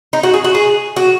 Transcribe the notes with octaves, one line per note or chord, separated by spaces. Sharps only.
D#4
F#4
G#4
F#4
G#4
F#4